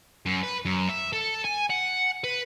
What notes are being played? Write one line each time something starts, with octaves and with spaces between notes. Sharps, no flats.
F#2
B4
F#2
E5
A4
G#5
F#5
B4